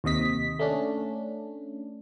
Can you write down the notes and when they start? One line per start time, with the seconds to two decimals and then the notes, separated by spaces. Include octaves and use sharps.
0.04 D#2 C3 D#5 B6
0.59 A3 C#4 D4